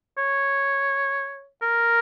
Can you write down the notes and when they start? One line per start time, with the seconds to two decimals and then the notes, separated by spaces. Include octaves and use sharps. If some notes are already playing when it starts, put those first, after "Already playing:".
0.18 C#5
1.62 A#4